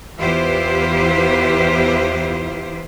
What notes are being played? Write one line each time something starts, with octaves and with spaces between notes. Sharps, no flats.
E2 E4 F4 G4 B4 C5